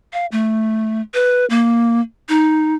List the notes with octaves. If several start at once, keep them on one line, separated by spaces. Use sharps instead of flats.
F5
A3
B4
A#3
D#4